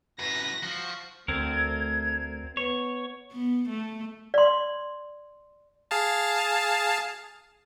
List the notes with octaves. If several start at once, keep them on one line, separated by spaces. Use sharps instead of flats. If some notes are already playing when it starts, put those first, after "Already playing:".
F#2 A2 B4 A#6
F3 F#4
D2 A3 C4 A#4 G#6
B3 C#5
B3
A3
D5 C6
G#4 F5 A5